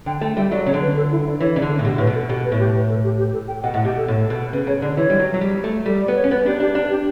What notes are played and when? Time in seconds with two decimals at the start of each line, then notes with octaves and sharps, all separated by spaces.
0.06 D3 G5
0.21 A3 G5
0.36 G3 E5
0.51 F#3 D5
0.66 C#3 C#5
0.74 D3
0.81 B4
0.96 A4
1.11 E4
1.26 D4
1.40 E3 C#5
1.55 C#3 D5
1.62 D3
1.70 A4
1.79 A2
1.85 B2 G4
1.98 A2 B4
2.07 B2
2.15 A4
2.29 B2 G4
2.44 B4
2.52 A2
2.59 G4
2.74 B4
2.89 A4
3.04 G4
3.18 G4
3.33 A4
3.48 G5
3.63 B2 F#5
3.74 A2 F#5
3.85 B2 G4
3.97 A4
4.08 A2
4.30 B2
4.53 C#3 B4
4.67 C#3 C#5
4.82 D3 D5
4.97 E3 C#5
5.10 G3
5.20 F#3
5.34 F#3
5.41 G3
5.64 A3
5.86 G3 A4
6.02 D5
6.08 B3
6.16 C#5
6.24 C#4
6.31 B3 B4
6.46 D4 G4
6.60 D4 G4
6.75 D4
6.90 G4